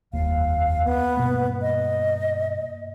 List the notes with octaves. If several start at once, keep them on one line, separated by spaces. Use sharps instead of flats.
F1 D#2 A#3 F5
B3
G2 B2 A#3
D#5